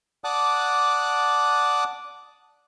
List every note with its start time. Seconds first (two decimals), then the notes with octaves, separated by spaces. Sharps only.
0.24 D5 F#5 A5 D6 D#6 F#6